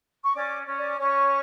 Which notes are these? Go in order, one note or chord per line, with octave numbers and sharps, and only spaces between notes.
C#6
C#4 D5 D6
C#4
D5 D6
C#4 C#5 C#6